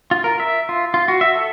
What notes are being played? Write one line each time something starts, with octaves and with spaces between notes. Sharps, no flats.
F4
A#4
E5
F4
F4
F#4
E5
A4